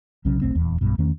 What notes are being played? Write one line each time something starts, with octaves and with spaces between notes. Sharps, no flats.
B1 C#3 F#3 C#4
E1 B1 A3 C4
D#1 E2
B1 G2 B2
E2 D#3 A3 C#4